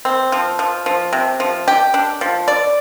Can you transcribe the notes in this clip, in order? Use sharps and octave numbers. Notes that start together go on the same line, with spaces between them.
C4
F3
F3
F3
C3
F3
G4
D4
F3
D5